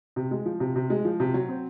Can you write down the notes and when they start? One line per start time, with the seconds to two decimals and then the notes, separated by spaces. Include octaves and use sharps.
0.16 C3
0.31 G#3
0.45 F3
0.60 C3
0.76 C3
0.90 G#3
1.05 F3
1.20 C3
1.34 F#3
1.49 C4